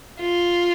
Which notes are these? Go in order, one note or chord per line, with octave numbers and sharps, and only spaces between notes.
F4